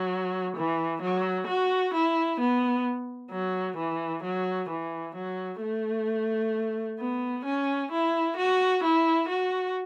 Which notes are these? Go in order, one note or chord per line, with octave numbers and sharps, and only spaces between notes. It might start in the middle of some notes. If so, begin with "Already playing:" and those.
Already playing: F#3
E3
F#3
F#4
E4
B3
F#3
E3
F#3
E3
F#3
A3
B3
C#4
E4
F#4
E4
F#4